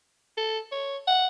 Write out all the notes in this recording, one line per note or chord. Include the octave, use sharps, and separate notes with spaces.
A4
C#5
F#5